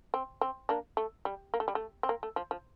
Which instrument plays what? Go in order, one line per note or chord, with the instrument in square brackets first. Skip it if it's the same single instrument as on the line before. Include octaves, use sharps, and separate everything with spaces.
[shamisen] C4
C4
A#3 D4
A3
G3
A#3
A3
G3
A3
C4
A#3
A3
F3
F3